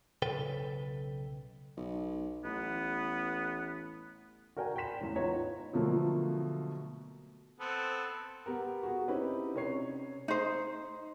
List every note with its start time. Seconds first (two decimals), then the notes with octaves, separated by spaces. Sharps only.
0.22 B1 C#3 A4 B4 G5
1.77 B1
2.44 A1 B3
4.57 F#4 A#4 D5 G5 G#5 A#5
4.76 G5 B5 C6 B6 E7
5.01 A1 E2
5.16 B3 D#4 F4 C#5 A#5
5.73 B2 D3 F3 F#3 A3 A#3
7.60 B3 C4 A4
8.46 B3 G4 A#4
8.83 F#4 G#4
9.08 C4 C#4 D#4 E4 G4 B4
9.54 C3 C#4 C#5 C7
10.28 D#4 C5